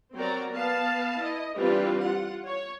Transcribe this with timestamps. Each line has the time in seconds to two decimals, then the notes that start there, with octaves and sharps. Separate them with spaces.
0.15 F#3 C4 F#4 A#4 D5 A#5
0.51 B3 B4 F5 A5
1.21 E4 D#5
1.56 E3 G3 C4 D4 F4 B4
2.01 F4 F#5
2.47 C#5